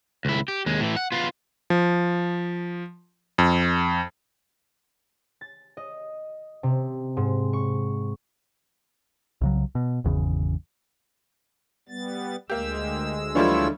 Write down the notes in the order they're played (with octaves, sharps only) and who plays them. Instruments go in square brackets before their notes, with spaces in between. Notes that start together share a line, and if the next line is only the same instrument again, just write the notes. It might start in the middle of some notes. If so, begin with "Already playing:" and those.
[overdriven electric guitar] C#2 E4
G4
D#2 G#3
A2 E3
F#5
B3 F4
[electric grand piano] F3
F2
[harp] A6
D#5
C3
G#2
C#6
[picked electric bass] C2 C#3 F#3
B2
G#1 E2 C#3
[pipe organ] G3 B3 A6
[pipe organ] D2 G#3 E6 [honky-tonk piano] A#3 G4
[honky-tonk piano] E3 F3 G3 [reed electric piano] D4 A4 [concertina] E4 F4 C#5